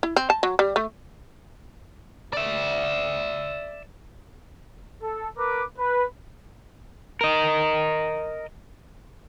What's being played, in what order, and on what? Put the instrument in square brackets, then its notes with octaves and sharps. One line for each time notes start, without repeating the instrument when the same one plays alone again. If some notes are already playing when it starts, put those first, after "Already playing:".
[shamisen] E4
C4
A5
F#3
G3
A3
[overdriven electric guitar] D5 E5
[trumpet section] A4
A#4 B4 D6
B4
[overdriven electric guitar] A#4 D#5